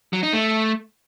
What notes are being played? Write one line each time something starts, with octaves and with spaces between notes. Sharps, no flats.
F#3
D#4
A3